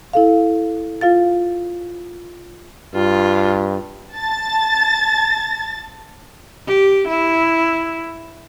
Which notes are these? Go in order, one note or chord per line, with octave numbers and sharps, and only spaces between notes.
E4 A4 F5
F4 F5 A6
G2 F4
A5 A6
G4
E4